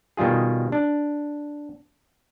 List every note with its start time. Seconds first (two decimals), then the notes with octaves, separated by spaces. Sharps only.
0.17 B2 D#3 G3 F4 G#4
0.72 D4